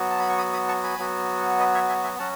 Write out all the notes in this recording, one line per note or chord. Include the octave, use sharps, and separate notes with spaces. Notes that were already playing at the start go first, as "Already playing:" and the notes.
Already playing: F#3 B3 F#4
A5
B5
C#6
B5 D#6
B5 D#6
A5 C#6
G#5 B5
F#3 B3 F#4
B4 D#5
C#5 E5
E5 G#5
E5 G#5
F#3 C#4 F#4 F#5 A5